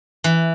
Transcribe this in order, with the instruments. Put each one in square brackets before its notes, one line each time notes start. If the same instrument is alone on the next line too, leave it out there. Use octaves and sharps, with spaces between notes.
[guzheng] E3